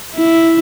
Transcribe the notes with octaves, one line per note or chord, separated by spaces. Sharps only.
E4